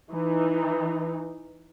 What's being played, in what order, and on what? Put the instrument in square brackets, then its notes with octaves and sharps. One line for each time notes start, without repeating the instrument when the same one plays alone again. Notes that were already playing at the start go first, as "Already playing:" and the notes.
[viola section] E3 D#4